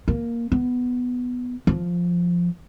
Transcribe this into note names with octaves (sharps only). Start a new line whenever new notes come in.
A#3
B3
F3